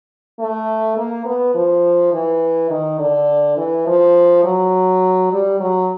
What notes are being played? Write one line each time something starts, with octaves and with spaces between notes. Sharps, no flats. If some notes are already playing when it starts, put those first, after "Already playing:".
A3
A#3
B3
F3
E3
D#3
D3
E3
F3
F#3
G3
F#3